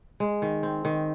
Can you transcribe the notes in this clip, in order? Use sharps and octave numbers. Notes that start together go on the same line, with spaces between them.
G#3
D#3
C4
D#3